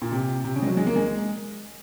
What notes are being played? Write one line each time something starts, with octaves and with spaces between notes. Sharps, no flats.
A#2
C3
C3
C#3
G#3
F#3
G#3
A#3
G#3